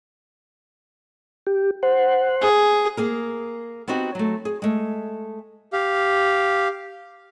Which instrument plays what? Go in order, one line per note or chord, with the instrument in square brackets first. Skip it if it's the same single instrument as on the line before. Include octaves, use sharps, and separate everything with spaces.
[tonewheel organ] G4
C5 F#5
[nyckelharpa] G#4
[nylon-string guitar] A#3 G#4 A#4
B3 C4 D#4 F#4 G4
F#3 A3
G#4
G#3 A3
[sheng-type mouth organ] G4 F5